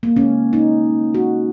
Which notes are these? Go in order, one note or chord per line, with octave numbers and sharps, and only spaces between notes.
A#3
C#3 G#3 C#4
D#4
F#4